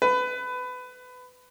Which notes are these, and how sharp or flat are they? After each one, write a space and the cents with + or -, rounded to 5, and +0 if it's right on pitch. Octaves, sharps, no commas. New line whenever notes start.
B4 +20